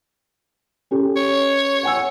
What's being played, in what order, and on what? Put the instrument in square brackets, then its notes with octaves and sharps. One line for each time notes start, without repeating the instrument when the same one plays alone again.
[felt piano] C#4 G4 A4
[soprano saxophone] C#5
[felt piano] F#5 G#5 E6